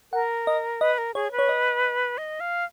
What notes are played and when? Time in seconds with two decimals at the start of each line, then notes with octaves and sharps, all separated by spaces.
0.13 A#4 F#5
0.47 D#5
0.81 B4 D#5
0.98 A#4
1.15 G#4 C#5
1.32 B4
1.39 C#5
1.49 D#5
2.18 D#5
2.40 F5